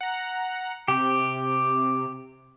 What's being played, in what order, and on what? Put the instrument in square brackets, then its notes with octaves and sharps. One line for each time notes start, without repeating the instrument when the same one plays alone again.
[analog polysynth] F#5 A#5
[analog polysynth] C3 [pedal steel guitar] G4